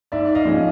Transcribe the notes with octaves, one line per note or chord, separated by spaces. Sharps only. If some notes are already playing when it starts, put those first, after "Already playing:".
G#2 D5 E5
D#5 F5
F3 G#3 C#4